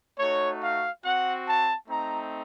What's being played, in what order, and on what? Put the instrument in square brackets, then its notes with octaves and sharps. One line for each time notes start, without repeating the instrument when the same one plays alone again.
[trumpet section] A3 D#4 F#4 C#5
F5
C4 F#4 F#5
A5
A3 C4 D#4 A#5